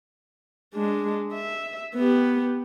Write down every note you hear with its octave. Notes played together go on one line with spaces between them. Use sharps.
G#3 D4
E5
B3 G4